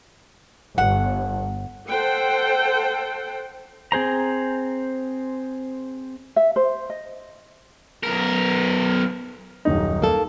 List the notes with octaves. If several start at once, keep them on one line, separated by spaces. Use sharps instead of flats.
G1 F#5
A4 C5 F#5 G5
C4 G#4 C5 A#5
E5
C5
D#5
B1 A#4
D#1 F#2 D#4
A#3 A4